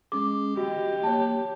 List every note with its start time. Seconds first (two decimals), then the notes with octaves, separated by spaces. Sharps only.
0.12 G#3 C#4 G#4 D6
0.57 F#4 G4 D#5
1.03 A#3 C#5 A5